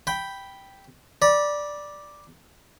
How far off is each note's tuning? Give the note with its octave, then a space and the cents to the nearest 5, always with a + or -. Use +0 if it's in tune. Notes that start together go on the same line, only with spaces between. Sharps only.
G5 +0 B5 +0
D5 +0 B5 -35